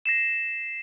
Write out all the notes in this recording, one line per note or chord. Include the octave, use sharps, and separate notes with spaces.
A#6 C7 E7